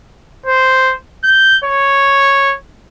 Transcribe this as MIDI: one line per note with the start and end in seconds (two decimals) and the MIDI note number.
0.46 0.94 72
1.24 1.58 91
1.64 2.54 73